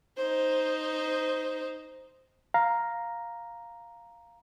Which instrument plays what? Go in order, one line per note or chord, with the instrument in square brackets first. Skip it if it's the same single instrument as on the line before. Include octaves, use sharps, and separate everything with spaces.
[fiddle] D#4 C5
[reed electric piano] F5 A#5